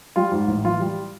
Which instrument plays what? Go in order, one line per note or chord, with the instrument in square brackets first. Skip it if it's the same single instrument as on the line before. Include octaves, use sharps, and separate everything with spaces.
[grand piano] G3 F4
G#2
A1
E3 F4
G3